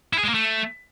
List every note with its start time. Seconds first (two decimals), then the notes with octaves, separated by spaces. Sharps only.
0.13 E4
0.18 G#4
0.24 G#3
0.29 A#3
0.34 A3